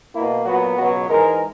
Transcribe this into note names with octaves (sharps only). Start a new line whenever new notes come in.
B2 A#3 E4
A#2 F#3 B3 F#4
C#2 B2 F#3 B3 F#4
G#2 E3 G#3 A#4